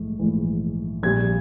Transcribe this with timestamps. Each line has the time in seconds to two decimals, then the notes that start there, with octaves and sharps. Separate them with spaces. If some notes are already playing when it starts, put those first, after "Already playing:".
Already playing: A#1 G#2 E3 A3
0.19 A#1 G#2 E3 A3
1.03 A#1 A#2 G3 G#6